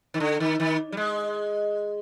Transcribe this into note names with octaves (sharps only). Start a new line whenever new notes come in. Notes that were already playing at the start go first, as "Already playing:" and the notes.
D#3
D3
D#3
D#3
G3
G#3